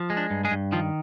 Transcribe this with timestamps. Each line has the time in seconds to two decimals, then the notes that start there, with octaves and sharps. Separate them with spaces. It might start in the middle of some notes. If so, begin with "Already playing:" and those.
Already playing: F3
0.10 G#3
0.17 D4
0.30 G2
0.45 G#3 G#4
0.51 G2
0.72 D#3 F3 F4